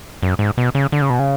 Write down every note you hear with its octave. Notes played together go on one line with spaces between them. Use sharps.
F#2
G#2
B2
C#3
D3
C#3
B2
C#3